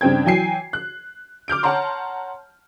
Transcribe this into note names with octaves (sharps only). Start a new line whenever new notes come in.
G2 C#3 C4 G5 G#6
E3 F#3 G5 G#5 C7
F#6
D6 F6 G6 D7
C#5 F#5 A5 A#5 C6